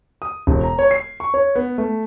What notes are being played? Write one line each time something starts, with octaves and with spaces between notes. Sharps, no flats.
D#6
E1
A#5
C#5
C7
C#6
C#5
B3
A3